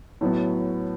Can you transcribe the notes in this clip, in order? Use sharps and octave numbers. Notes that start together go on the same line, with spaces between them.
A2 F#3 B3